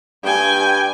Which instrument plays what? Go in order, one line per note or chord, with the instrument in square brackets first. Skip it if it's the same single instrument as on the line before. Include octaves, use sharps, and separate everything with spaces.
[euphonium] G2 [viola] G5 G#5